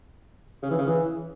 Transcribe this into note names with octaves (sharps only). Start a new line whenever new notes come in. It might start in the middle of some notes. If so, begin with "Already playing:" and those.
C#3
E3
C#3
E3